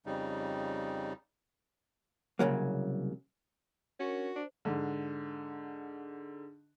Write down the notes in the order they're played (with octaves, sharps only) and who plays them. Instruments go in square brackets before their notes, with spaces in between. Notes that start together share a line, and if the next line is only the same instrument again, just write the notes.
[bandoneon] F2 C#3 G3 D#4
[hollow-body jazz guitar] C2 C#3 F#3 A#3
[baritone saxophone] C#4 [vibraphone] D4 A#4 G#5 [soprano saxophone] F#4
[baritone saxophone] D4 [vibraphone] C5
[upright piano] G#2 D3